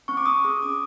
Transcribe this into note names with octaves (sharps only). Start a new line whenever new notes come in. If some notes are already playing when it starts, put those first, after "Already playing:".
C4 C#6
D6
C4 D#6
G#4 D#6
C#4 D6